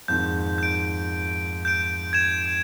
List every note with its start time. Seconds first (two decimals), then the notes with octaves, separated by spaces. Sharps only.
0.08 F2 G#2 D#3 G6
0.58 G6 D7
1.65 G6 D7
2.13 G#6 E7